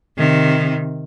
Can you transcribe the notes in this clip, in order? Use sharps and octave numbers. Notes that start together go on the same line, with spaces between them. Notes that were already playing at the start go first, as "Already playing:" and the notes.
C3 D#3